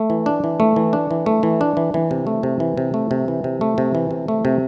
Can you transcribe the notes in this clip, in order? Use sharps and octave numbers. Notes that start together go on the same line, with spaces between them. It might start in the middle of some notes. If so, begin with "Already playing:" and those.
Already playing: A3
E3
D4
E3
A3
E3
D4
E3
A3
E3
D4
E3
E3
C3
A3
C3
E3
C3
A3
C3
E3
C3
A3
C3
E3
C3
A3
C3